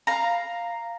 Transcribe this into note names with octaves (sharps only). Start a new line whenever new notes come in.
F5 A#5